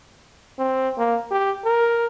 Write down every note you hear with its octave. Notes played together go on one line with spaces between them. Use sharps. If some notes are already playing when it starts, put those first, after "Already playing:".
C4
A#3
G4
A#4